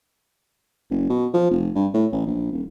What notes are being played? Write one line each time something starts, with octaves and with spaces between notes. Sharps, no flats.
F#1
B2
F3
F1
G2
A2
A1
A#1
D#1